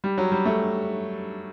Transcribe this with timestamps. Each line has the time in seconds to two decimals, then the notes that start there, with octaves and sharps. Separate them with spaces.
0.04 G3
0.18 F#3
0.32 G3
0.46 A3